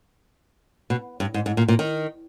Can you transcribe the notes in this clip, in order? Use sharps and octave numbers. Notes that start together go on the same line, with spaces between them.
B2
G2
G#2
G#2
A#2
A#2
D#3